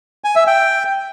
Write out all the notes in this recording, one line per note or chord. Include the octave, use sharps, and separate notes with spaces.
G#5
E5
G5